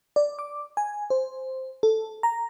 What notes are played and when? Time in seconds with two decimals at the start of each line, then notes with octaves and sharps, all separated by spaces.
0.16 D5
0.39 D6
0.77 G#5
1.10 C5
1.83 A4
2.23 A#5